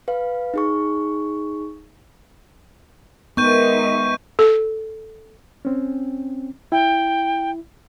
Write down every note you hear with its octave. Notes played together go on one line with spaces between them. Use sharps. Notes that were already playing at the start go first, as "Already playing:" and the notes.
B4 F5
D#4 G#4 C#6
D#3 G#3 B3 D#4 E5 C#6 G6 D#7
A4
C4 C#4
E4 G5